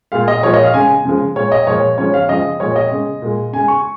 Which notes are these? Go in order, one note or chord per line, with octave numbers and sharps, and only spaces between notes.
A#2 G#3 F5
D#5
A#2 F3 G#3 C#5
D#5
F5
C#3 G#3 G#5
C#3 F3 G#3
A#2 G#3 C#5
D#5
A#2 F3 G#3 C#5
C#3 F3 G#3 C#5
F5
C#3 F3 G#3 D#5
A#2 F3 G#3 C#5
D#5
C#3 G#3
A#2 G#3
C#3 G#3 G#5
C#6